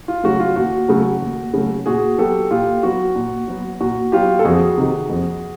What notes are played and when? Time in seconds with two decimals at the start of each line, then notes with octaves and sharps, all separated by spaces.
0.08 F4
0.24 C#3 F#3 A3 F#4
0.40 F4
0.56 D#2 F#4
0.89 C#3 F#3 A3
1.22 D#2
1.54 C#3 F#3 A3
1.86 A#2 F#4 G#4
2.18 F#3 B3 G4 A4
2.51 A#2 F4 G4
2.83 F#3 B3 F#4
3.16 A#2
3.47 F#3 B3
3.80 A#2 F#4
4.12 F#3 B3 F4 G4
4.39 A4
4.45 F2 F#4 G#4
4.78 C3 D#3
5.09 F2